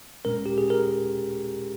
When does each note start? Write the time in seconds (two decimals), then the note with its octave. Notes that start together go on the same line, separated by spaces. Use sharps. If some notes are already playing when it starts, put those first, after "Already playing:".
0.25 A#2 G#3 C#4 A#4
0.46 G4
0.58 G#4
0.70 A#4